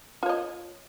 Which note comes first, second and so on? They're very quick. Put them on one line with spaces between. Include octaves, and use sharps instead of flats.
F4 C#5 D#5